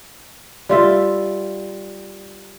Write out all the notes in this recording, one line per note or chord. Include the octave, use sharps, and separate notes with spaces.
G3 F4 E5